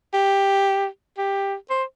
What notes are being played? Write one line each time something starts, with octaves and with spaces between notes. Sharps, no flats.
G4
G4
C5